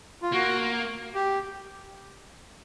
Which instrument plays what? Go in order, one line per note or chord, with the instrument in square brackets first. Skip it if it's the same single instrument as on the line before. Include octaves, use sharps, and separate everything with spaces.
[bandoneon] F4
[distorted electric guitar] A#3 [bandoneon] F#4
[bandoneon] G4